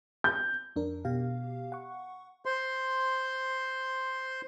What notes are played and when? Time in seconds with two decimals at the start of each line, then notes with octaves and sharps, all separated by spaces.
0.24 G6
0.76 F2 D4 A#4
1.05 B2 G4 F5
1.72 F#5 C#6
2.45 C5 C6